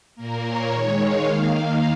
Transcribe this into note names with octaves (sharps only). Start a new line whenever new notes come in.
A#2 A#3 A#4
C#5
D#3 G#3
F5
D#3 A#3 F5
F5